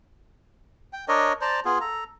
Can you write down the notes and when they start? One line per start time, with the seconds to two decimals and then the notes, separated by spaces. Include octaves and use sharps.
0.93 G5
1.08 D4 A#4 C#5 D#5
1.41 C5 D5 A5 A#5
1.65 B3 F4 G#4
1.81 A4 A#5